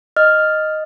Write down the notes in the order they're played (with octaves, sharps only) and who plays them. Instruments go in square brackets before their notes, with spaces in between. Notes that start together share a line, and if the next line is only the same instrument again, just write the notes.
[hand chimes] D#5 [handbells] F6